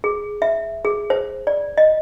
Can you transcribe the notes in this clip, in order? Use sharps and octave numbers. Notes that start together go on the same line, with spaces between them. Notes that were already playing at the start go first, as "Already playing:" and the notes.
G#4
E5
G#4
C5
D5
D#5